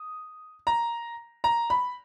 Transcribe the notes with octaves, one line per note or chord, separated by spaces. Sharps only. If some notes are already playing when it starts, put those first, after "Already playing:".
Already playing: D#6
A#5
A#5
B5